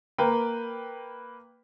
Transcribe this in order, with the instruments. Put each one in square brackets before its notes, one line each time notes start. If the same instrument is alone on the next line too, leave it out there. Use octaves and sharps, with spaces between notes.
[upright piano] A#3 A#4 B4 G5